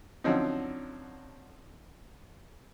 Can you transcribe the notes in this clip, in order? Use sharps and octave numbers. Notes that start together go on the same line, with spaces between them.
D3 F3 F#3 C4 C#4 D#4